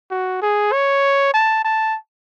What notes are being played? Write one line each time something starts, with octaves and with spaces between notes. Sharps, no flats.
F#4
G#4
C#5
A5
A5